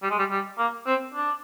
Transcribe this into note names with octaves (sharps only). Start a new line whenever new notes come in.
G3
G#3
G3
G3
A#3
C4
D4